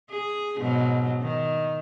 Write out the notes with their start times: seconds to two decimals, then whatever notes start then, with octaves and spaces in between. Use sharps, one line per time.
0.10 G#4
0.58 G#2 B2 F#3
1.21 D#3